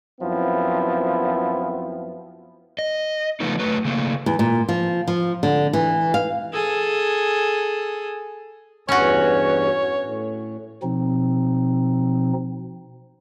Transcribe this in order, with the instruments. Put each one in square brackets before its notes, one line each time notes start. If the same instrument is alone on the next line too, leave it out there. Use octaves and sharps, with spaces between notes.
[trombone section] F#2 F3 B3 C4 E4
[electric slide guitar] D#5
C#3 F3 A3 B3 D#4
F#3 A3 B4
C#3 A3 A#3
[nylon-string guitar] E2
A#2
F3
F3
D3
E3
F5
[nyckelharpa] G#4 A4
[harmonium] E2 G2 [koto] C#4 F#4 [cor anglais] C#5
[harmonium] A2
[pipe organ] B2 F3 C4 D#4